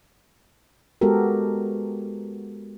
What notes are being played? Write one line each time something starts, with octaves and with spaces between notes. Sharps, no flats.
G#3 B3 F#4 G4 A4 A#4